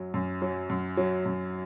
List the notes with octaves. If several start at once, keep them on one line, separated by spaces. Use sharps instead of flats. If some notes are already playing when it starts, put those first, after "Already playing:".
Already playing: F#2 F#3
F#2
F#3
F#2
F#3
F#2